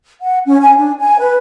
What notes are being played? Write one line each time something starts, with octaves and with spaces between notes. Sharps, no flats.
F#5
C#4
G#5
D4
G#5
B4